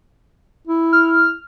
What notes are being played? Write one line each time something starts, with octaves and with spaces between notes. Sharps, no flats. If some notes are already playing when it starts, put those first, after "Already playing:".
E4
F6